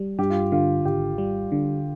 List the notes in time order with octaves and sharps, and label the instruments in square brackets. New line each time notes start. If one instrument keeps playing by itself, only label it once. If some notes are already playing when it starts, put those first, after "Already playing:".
Already playing: [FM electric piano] G3
[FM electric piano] G2 [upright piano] G4
[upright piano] F4
[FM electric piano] D3 [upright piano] F4
[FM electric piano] G#1 [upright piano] G4
[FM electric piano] G3
D3